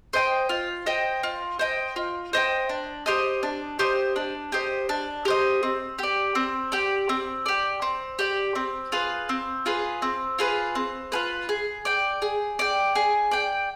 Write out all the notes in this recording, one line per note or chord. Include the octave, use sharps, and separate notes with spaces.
C5 D#5 G5
F4
C5 D#5 G5
F4
C5 D#5 G5
F4
C5 D#5 G5
D4
G4 C5 D#5
D4
G4 C5 D#5
D4
G4 C5 D#5
D4
G4 C5 D#5
C4
G4 D5
C4
G4 D5
C4
G4 D5
C4
G4 D5
C4
F4 G#4 B4
C4
F4 G#4 B4
C4
F4 G#4 B4
C4
F4 G#4 B4
G#4
D5 G5
G#4
D5 G5
G#4
D5 G5